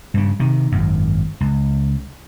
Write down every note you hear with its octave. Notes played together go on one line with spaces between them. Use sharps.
G2 C#3
C3 D#3
G#1 F#2
C#2